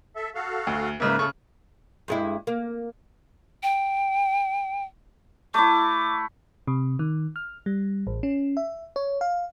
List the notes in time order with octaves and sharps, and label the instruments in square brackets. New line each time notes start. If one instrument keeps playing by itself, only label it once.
[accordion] A4 E5
F#4 A4 F5
[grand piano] D2
[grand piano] G#2 C#3 A#3 [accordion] D#4 B4 E5
[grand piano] C#3 C#6 [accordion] A3 A4
[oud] G2 G#3 E4
A#3
[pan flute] G5
[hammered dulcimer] A3 E4 [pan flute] D6
[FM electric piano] C3
D#3
F6
G3
A1
C#4
E5
C#5
F5